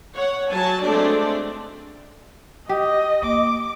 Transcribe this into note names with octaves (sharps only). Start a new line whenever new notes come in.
C#5 F#5
F#3 G#5 A5
G#3 A3 C4 D4 D5
G4 D#5
A#3 D6